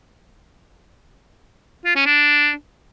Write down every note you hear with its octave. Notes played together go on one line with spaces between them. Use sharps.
F4
C#4
D4